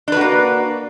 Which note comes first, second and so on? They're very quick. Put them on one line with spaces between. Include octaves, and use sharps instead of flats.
D4 B4 F#4 A#3